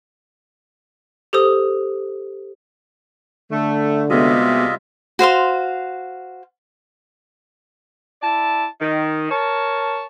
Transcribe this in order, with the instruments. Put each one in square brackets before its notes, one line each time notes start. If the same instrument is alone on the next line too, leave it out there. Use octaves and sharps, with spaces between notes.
[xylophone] G4 A4 C5 D#6
[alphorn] D3 [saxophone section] A3
[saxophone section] C3 G3 G#3 [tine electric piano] B3 F#4 [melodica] F4 D#5 E5
[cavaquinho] F#4 C5 F5 C6
[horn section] E4 D5 A5
D#3
A#4 C#5 A5